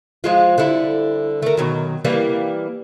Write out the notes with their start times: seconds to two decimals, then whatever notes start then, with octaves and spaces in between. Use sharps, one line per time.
0.24 F3 G#3 F4
0.58 D3 G3 E4
1.42 A3 A#4
1.57 B2 D#3 F#3
2.04 E3 G3 A#3